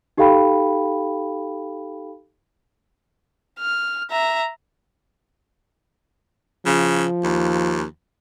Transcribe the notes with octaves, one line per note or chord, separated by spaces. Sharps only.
D#4 G4 A4 F5 G5 B5
F6
E5 A#5
C#3 F3
D#2